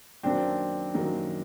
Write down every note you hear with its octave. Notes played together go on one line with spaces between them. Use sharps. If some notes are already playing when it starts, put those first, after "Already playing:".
F#2 D#3 F#3 A#3 C4 D4
F#2 D#3 F#3 A#3